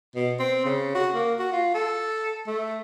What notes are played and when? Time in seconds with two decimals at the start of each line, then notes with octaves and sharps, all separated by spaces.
0.16 B2
0.40 C4
0.65 C#3
0.95 F#4
1.14 A#3
1.39 F#4
1.53 F4
1.74 A4
2.47 A3